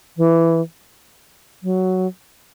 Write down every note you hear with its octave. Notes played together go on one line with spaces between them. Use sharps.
E3
F#3